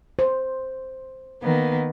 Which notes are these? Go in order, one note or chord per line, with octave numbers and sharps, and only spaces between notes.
C5
D#3 A#3 B3